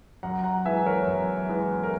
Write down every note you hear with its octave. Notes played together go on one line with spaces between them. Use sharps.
F#2 F#5 A#5
F#5 A#5
E3 G#3 B3 E5 G#5
A#4 C#5
F#2
E3 G#3 B3
A#4